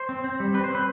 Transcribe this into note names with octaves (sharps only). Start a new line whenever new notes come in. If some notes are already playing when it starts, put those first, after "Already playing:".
Already playing: C5
C4
C4
G3
C4 B4
C5
C4
B4